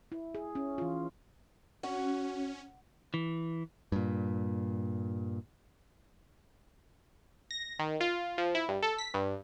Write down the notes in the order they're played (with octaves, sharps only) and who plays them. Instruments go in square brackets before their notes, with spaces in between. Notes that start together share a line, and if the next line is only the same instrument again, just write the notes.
[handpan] E4
G#4
C#4
E3 F4
[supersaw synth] C#4 [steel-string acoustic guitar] F#4
[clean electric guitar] E3
[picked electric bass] G2 A#2
[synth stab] A#6
D#3
F4
F3
E4
G2
A4
B6
G2